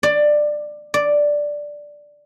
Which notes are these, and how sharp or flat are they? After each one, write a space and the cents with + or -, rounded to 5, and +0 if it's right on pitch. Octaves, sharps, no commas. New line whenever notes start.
D5 +15
D5 +0